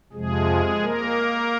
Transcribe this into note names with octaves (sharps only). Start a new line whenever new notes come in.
F2 C3 F3 G#3 G#4
A#3 A#4